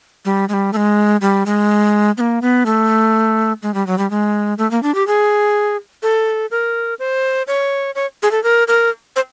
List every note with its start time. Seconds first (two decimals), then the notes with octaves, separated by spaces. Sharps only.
0.25 G3
0.49 G#3
0.54 G3
0.73 A3
0.77 G#3
1.21 G3
1.46 G#3
2.17 B3
2.21 A#3
2.42 B3
2.66 A3
3.62 G#3
3.74 G3
3.87 F#3
3.98 G3
4.10 G#3
4.58 A3
4.71 A#3
4.83 D4
4.95 G4
5.07 G#4
6.03 A4
6.51 A#4
6.99 C5
7.47 C#5
7.95 C#5
8.23 G#4
8.31 A4
8.44 A#4
8.68 A#4
9.16 C5